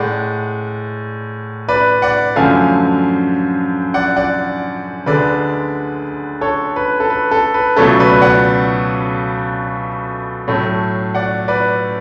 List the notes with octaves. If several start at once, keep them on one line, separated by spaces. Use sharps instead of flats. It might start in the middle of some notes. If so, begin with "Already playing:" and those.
Already playing: A2 G#3 D5 F#5
B4 D5
D5 F#5
F#2 D3 F3 A3 F5 G#5
D5 F#5
D5 F#5
D2 D3 G#3 B4 D5
A4 C#5
B4
A4
B4
A4
B4
C#2 B2 F#3 A3 A4 C#5
B4 D5
D5 F#5
A2 F#3 A3
D5 F#5
B4 D5